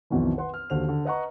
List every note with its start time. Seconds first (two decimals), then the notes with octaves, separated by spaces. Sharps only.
0.10 B1 F2 B2 D#3 E3
0.38 B4 F#5 C6
0.54 F6
0.70 D#2 D3 F#4 C5 F7
0.89 D3
1.05 B4 D#5 F#5 A#5 C#6